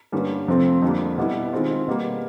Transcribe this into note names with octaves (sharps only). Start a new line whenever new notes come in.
G2 D3 G3 A#3 C#4
F2 C3 F3 A3 C4
F2 D3 G3 A#3
B2 G3 B3 E4
D#3 G#3 C4 F4
B2 G3 A#3